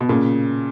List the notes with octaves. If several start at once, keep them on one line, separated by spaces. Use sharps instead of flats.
B2
A#2 C#3